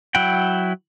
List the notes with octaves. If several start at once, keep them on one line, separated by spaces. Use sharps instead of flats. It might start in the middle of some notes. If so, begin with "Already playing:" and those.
F#3 E4 F#5 G5